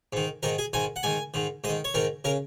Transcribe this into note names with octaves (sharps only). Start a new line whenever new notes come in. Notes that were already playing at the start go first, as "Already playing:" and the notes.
G#2 D#3
G#2 D#3 A#4
G#4
G#2 D#3 G#5
F#5
G#2 D#3 G#5
G#2 D#3
G#2 D#3 D#5
C#5
G#2 D#3 A#4
C#3 A#4